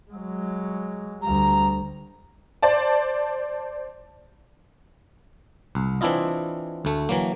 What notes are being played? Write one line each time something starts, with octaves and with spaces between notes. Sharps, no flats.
F#3 G#3
D2 G3 A#5
C5 D5 A5
C2
E3 C4 D4 E4 F4 D#5
D2 A3
E3 F#3 A#3